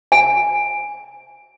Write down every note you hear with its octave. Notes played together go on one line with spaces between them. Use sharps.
G#5